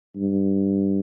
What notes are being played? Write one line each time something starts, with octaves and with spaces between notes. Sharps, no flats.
G2